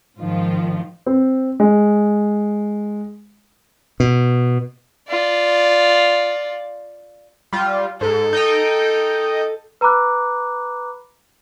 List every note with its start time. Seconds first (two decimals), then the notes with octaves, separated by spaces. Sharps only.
0.18 G#2 D#3 F3 F4
1.06 C4
1.60 G#3
4.00 B2
5.08 F4 D5
7.53 G3 F4
8.01 G#2 A4
8.33 D#4 D#5 G5
9.81 B4 A#5 B5 D6 F#6